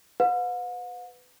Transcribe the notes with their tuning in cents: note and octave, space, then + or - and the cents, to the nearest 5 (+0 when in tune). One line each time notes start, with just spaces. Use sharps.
B4 +15 F#5 -45